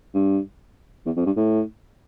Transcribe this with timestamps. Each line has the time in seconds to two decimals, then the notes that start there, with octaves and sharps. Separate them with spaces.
0.14 G2
1.06 E2
1.16 F2
1.26 G2
1.37 A2